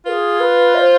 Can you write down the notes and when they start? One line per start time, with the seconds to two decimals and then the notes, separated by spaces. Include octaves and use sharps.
0.05 F4 G#4 B4
0.40 B4
0.74 E5
0.79 C5